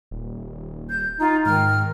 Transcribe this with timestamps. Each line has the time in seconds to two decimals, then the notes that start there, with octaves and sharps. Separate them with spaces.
0.11 D#1
0.89 G6
1.20 D#4 F4
1.46 G#2 D#3 F6